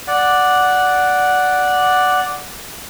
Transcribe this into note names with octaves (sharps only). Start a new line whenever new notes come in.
D5 F#5